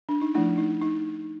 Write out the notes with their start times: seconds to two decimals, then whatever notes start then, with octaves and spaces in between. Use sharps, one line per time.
0.09 D4
0.21 D#4
0.34 F3 A3 D4 E4
0.58 D#4
0.82 D#4